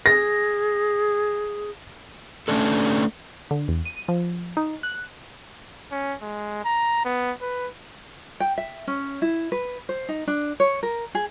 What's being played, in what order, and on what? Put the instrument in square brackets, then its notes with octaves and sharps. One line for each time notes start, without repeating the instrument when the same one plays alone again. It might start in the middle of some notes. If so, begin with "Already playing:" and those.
[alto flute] G#4 [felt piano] A#6
[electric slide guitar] A3 C#4 D4 A4
[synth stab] D3
E2
D#7
F3
D#4
F#6
[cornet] C#4
G#3
A#5
B3
B4
[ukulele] G5
E5
C#4
E4
B4
C5
D#4
D4
C#5
A#4
G#4